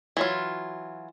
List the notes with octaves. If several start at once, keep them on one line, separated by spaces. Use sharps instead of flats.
E3 F#3 F4